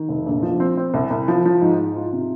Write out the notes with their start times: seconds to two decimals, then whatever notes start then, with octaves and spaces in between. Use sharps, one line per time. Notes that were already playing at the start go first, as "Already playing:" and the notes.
Already playing: D#3
0.09 F1
0.26 A#1
0.42 F3
0.60 C4
0.77 C4
0.94 C2
1.10 C2
1.28 F3
1.45 F3
1.61 G#2
1.79 G#2
1.96 F4
2.13 C3